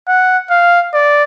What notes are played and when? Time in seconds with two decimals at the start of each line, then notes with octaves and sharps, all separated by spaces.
0.08 F#5
0.51 F5
0.94 D5